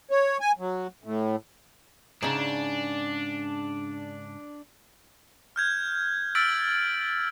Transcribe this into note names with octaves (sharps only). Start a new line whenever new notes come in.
C#5
G#5
F#3
A2
G#2 C#3 D4
F6 G6 G#6
E6 F6 A6 B6 D7 F#7